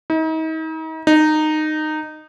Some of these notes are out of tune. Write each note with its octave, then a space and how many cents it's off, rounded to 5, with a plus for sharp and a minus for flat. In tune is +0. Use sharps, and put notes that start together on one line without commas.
D#4 +40
D#4 -15